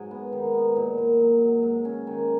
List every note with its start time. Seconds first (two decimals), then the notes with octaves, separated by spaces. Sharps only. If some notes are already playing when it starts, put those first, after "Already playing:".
Already playing: G#2 F#3
0.11 B3
0.32 D#3
0.54 B3
0.76 A#2
0.98 A#2
1.20 F#3
1.41 F#3
1.63 G#2
1.85 C#4
2.07 D#3